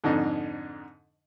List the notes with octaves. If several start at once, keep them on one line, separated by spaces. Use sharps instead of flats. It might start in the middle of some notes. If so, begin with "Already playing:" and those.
F2 G#2 D3 D#4